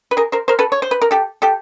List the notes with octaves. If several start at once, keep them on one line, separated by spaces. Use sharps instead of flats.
B4
G#4 A#4
A#4 C5
A#4 C5
A4 B4
C#5
C5
B4
A#4
G4 A4
G4 A4